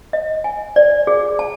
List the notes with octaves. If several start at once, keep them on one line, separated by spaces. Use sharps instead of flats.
D#5
G#5
D5
G#4
A5